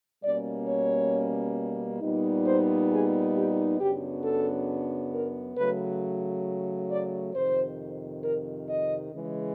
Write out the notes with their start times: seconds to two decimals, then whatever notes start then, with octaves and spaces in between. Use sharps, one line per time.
0.24 B2 G3 A#3 C#4 D5
0.68 C#5
2.01 A#2 G3 B3 D#4
2.46 C5
2.90 G#4
3.35 G4
3.79 F#2 C#3 F#3 B3 D4 G4
4.23 A4
5.13 A#4
5.56 C#3 F#3 A3 B4
6.90 D5
7.34 F2 C3 D#3 C5
8.23 A#4
8.68 D#5
9.12 C#3 E3 G#3